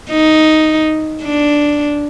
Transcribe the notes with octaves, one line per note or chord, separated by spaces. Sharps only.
D#4
D4